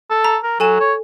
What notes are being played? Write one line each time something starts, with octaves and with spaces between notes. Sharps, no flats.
A4
A#5
A#4
F#3 A4 G#5 E7
C#5